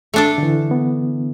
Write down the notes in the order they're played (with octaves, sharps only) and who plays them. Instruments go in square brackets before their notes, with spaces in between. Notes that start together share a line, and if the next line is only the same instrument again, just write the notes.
[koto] A3 D4 A4
[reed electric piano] D3
E3
B3